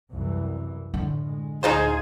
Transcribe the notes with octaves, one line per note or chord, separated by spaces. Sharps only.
C2 F#2 E3
A2 D3
G#3
D2 A2 D#4 F4 G#4 C5